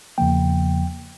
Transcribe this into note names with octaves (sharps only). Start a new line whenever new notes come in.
E2 C#3 F3 A#3 G5